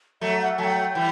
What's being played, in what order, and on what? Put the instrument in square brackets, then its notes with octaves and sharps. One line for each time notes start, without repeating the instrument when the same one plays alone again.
[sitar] F#3 A3 [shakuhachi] E5
[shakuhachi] F#5
[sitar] F#3 A3 [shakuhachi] A5
[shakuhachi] G5
[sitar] E3 G3